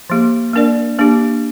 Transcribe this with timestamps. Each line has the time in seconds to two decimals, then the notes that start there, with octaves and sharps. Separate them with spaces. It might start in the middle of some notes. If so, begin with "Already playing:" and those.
0.10 F3 A#3 G4
0.53 A#3 D4 A#4 D5
0.99 A#3 D4 G4